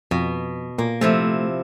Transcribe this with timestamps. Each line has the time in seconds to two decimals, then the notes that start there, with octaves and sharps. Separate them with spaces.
0.11 F2 B2
0.78 A#2 A#3
1.01 C3 F3 A3 E4